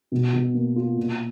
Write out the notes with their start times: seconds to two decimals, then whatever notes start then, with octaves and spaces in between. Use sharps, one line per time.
0.12 B2
0.33 B2
0.54 A#3
0.76 F4
0.97 A#2